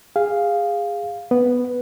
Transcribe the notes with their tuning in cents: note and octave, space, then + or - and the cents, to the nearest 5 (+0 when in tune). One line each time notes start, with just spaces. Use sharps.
G#4 -20 F5 +0
B3 +0 B4 +0